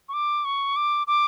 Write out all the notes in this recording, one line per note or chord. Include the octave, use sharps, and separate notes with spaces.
C#6
D6
C#6
D6
D6